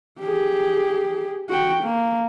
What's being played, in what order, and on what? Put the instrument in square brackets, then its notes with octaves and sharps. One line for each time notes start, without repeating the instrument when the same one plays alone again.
[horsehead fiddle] G4 G#4
F#4 G5
A#3